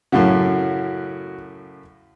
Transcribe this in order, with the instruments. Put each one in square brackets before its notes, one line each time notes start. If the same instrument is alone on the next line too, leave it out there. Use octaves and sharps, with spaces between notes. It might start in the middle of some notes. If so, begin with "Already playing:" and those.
[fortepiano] F#2 A2 C#3 [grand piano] F#4